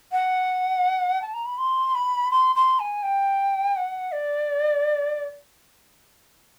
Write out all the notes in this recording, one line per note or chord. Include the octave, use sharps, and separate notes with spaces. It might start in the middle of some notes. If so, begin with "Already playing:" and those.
F#5
A5
A#5
B5
C6
B5
C6
C6
G#5
G5
F#5
D5